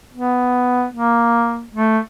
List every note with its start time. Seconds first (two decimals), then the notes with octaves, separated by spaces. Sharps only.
0.14 B3
0.94 A#3
1.75 A3